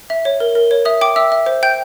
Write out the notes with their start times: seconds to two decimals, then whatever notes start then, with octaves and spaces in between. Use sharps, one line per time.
0.10 E5
0.25 C#5
0.40 A#4
0.55 A#4
0.71 C#5
0.85 E5 D#6
1.01 G5 D6
1.16 E5 E6
1.32 E5
1.46 C5
1.63 G5 G6